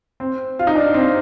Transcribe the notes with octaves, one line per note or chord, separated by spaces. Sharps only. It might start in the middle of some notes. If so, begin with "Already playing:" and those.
C4
F4
D#4
D4
C4